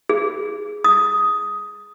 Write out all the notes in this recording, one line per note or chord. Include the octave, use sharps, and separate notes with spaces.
G#4
D#6